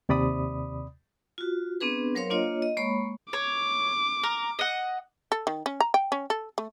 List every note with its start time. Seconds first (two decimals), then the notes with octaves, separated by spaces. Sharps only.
0.09 D#2 C3 D5 B5 D#6
1.38 F4 F#4
1.81 B3 C4 D4 G#4 B4
2.15 F#3 A#4 C5 C#5 F5 C6
2.30 A#3 D4 F4 C#5 D#5
2.62 D#5
2.77 G#3 A#3 C#5 B5 C#6
3.33 C#5 D6
4.23 A#4
4.59 D#5 F#5
5.32 A4
5.47 D#3
5.66 C#4
5.80 A#5
5.94 G5
6.12 C#4
6.30 A4
6.58 A3